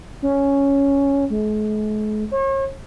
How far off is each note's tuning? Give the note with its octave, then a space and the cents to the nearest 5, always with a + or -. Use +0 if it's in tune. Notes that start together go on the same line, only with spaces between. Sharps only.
C#4 +5
G#3 +45
C#5 -40